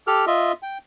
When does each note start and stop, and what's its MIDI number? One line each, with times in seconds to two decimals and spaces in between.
0.07 0.25 67
0.07 0.25 69
0.07 0.25 89
0.27 0.52 65
0.27 0.52 75
0.27 0.52 76
0.62 0.78 79